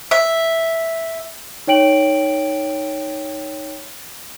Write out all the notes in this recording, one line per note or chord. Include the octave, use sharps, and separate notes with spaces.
E5
D#4 C#5 G5 D7 F#7